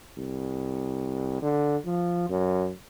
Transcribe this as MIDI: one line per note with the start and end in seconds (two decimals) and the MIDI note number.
0.18 1.37 36
1.42 1.77 50
1.85 2.29 53
2.29 2.71 42